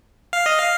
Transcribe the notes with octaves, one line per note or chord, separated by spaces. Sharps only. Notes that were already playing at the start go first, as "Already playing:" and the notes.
F5
D#5
F5